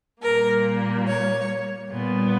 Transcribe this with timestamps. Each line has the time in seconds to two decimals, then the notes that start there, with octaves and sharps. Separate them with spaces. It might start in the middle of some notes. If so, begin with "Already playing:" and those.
0.22 A#2 G3 A#3 A#4
1.06 C#5
1.90 A#2 G3 B3